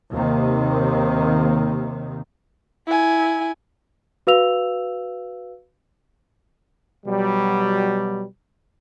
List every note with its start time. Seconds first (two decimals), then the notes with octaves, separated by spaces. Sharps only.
0.10 D#2 C3 D#3
2.87 E4 G#5
4.27 F#4 B4 F5 E6 F7
7.06 B2 F#3 G3